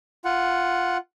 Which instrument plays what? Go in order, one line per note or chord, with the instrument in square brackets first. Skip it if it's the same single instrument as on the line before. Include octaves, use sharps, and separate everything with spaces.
[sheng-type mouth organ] F4 F#5